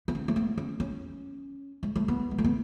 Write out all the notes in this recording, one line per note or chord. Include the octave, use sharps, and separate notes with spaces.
B3
C#4
A3
B3
C#4
C#4
G#3
A3
B3
G#3
A3
B3